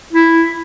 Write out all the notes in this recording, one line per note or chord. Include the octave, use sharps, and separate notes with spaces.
E4